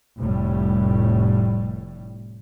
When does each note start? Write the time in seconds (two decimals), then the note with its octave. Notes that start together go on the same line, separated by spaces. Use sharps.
0.19 F1 A2 G3